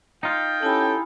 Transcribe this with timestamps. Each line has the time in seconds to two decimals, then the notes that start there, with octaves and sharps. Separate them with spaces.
0.23 D#4 F4 G5
0.63 C#4 E4 G4 A4 G#5 B5